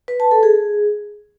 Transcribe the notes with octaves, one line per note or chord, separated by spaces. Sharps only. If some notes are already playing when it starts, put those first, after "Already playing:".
B4
A5
A4
G#4